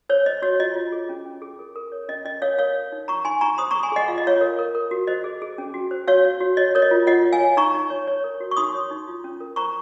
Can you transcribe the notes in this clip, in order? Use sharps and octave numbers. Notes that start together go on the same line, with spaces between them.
C5 C#5
C5 D#5
F#4 C#5
F4 D#5
F4
G#4
C#4
C#4
G#4
A#4
A#4
C#5
C#4 D#5
C#4 D#5
A#4 C#5 F5
A#4 C#5 F5
C#5
D#4
D#4 A#5 C#6
D#4 G#5 C6
D#4 A#5 C#6
C5 C6 D#6
G#4 A#5 C#6
G#5 C6
G#4 D#5 F#5
F4 F5
D#5
F4 C#5 F5
A#4
A#4
A#4
F#4
C5 D#5
G#4
G#4
C#4
F#4
C5
F#4 C#5 F5
C#5
F#4
C#5 D#5
A#4 C#5
D#5
F4
F4 D#5 F#5
C#5
F5 G#5
C#5
D#4 A#5 C#6
D#4
C#5
C#5
A#4
F#4
C#6
D#4 C6 D#6
C#5
D#4
F4
C#4
A#4
C5 A#5 C#6